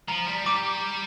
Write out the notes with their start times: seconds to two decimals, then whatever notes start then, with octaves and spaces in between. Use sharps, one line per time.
0.08 F3 A#5
0.27 G3
0.46 G3 D6